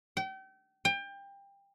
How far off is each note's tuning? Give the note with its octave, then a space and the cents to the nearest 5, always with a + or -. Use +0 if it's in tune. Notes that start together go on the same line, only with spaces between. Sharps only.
G5 -35
G5 +25